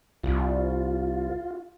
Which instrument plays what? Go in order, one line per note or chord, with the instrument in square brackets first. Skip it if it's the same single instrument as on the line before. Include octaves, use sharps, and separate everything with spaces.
[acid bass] C2 [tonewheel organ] F4